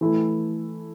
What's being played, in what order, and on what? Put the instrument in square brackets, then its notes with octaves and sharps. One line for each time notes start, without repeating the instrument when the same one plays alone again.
[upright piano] E3 A3 E4